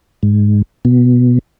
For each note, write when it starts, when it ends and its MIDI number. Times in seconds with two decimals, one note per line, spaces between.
0.23 0.62 44
0.85 1.39 47